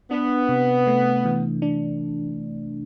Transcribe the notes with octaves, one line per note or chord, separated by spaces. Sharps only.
B3 D4
C3
A3
E3
D4